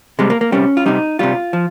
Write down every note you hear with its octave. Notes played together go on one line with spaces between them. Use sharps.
C3 G3 G#3
A#3
A#3
C3 G3 C#4
F4
C3 G3 D#4
C3 G3 F4
F3